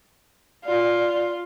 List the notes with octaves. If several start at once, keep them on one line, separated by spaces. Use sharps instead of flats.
F4 D5